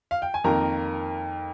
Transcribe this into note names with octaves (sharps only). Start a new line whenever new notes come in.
F5
G5
G#5
F2 D#3 A#3 A#4 A#5